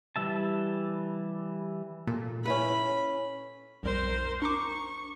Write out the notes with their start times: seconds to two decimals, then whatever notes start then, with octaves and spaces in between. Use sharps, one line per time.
0.16 E3 G3 E5 A5
2.07 A#2 A4
2.46 C#4 E4 B4 B5
3.83 B1 F2 G3 A#4 C5
4.42 D4 A#5 C#6 D6